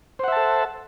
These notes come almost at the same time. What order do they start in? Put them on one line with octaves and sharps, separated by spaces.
C5 F#5 E5 A5 A4